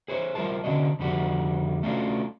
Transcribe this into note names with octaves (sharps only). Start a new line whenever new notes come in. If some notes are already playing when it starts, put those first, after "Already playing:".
G#4 C5 C#5
G3 F4 A#4 C5 E5 A5
D3 C#4 D4 F#4 D#5
F2 D3 G3 F#4
A3 C#4 D4 F4 F#4 A4